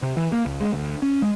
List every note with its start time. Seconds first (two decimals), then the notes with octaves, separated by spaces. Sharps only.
0.02 C3
0.17 E3
0.32 A#3
0.46 C#2
0.61 G#3
0.73 D2
1.02 C#4
1.22 G#3